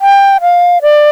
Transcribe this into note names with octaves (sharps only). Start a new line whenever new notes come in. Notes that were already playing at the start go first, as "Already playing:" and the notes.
G5
F5
D5